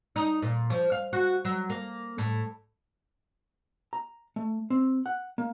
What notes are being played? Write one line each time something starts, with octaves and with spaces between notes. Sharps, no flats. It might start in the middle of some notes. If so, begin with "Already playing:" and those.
D#4
A#2
F3
F5
F#4
F#3
A#3
A2
A#5
A3
C4
F#5
A#3